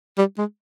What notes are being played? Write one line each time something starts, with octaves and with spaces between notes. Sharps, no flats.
G3
G#3